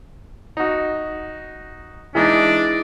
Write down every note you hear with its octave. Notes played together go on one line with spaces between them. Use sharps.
D#4 F#4
E3 G#3 D4 D#4